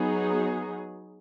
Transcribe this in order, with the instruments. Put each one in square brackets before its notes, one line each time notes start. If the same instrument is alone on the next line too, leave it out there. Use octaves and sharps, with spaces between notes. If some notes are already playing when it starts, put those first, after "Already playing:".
Already playing: [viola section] F#3 B3 D#4 G#4